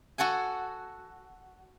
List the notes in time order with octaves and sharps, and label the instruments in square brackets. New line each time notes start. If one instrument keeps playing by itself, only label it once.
[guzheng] F#4 A4 F#5 G#5